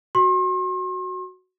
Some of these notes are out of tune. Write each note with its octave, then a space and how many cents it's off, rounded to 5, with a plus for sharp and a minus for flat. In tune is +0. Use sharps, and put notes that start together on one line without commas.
F#4 +0 C6 +40